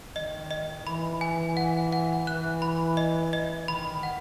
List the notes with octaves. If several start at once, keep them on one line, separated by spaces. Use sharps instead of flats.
D#3 D#5
D#5
E3 B5
G#5
F#5
F#5
E3 F#6
B5
D#5
D#5
D#3 B5
F#5